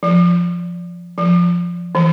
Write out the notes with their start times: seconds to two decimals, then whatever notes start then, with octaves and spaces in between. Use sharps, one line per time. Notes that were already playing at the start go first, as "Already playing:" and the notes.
0.03 F3
1.18 F3
1.95 E3